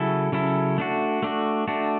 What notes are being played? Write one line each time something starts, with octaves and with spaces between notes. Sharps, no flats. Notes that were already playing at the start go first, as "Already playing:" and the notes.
Already playing: C#3 F#3 C#4 E4 A4
C#3 F#3 C#4 E4 A4
A3 D4 F#4
A3 D4 F#4
A3 D4 F#4